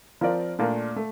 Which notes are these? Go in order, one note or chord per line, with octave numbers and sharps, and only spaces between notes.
F3 C4 F4 A#4 D5
A#2 A3 D4 F4 A#4
A3